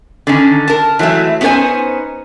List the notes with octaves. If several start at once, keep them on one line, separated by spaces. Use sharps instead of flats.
D3 D#3 C#4
A#4 A5
E3 F#3 G#3 A3 E5
B3 C#4 D#4 A4 C5 G#5